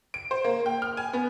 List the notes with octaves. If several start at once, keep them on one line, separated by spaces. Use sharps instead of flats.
D7
C5
A#3
G5
F6
G#5
B3